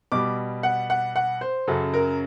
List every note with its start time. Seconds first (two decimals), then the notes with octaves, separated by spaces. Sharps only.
0.12 B2 G3 D6
0.63 F#5
0.90 F#5
1.16 F#5
1.41 C5
1.67 F#2 C#3 F#3 A4
1.94 A#4